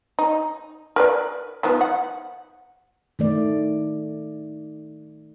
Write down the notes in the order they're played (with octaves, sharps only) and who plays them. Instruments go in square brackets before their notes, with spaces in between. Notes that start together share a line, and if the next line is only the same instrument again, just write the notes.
[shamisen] D#4
A#4 B4 D5
D#3 F3 B3
F#5
[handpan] D#3 A3 D5